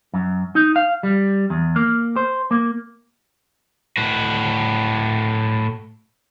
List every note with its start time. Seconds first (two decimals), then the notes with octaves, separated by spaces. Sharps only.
0.14 F#2
0.55 D#4
0.76 F5
1.03 G3
1.50 E2
1.76 A#3
2.16 C5
2.51 A#3
3.97 A2 F#4